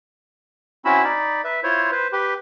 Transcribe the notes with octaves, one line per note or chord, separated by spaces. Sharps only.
C4 C#4 E4 F#4 B5 E6
D#4 D5 B5
B4 E5
E4 F4 C5 C#5
B4 C5
G4 B4